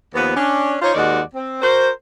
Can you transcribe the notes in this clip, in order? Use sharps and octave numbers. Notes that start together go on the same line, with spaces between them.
D#2 F3 B3
C#4 D4
D#4 F4 C5 C#5
D#2 D#3 G#3 F#4 D5
C4
F#4 A#4 C5